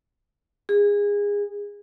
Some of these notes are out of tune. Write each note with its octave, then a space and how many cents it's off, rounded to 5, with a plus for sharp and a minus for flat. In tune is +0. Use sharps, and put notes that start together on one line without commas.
G#4 -25